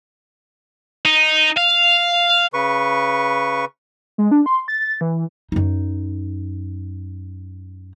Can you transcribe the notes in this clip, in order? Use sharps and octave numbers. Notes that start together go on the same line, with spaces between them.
D#4
F5
C#3 B4 C#6
G#3
D4
C6
A6
E3
F#2 D#4